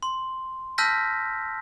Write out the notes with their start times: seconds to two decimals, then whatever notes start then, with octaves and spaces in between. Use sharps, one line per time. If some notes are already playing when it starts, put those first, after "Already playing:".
0.03 C6
0.78 A5 E6 F6 G6 A#6 B6